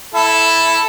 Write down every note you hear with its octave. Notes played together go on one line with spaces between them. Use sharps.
E4 A4